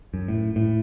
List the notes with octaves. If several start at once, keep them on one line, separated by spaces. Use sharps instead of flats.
F#2
A2
A2